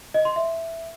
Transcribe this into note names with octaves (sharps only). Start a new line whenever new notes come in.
D#5
C6
E5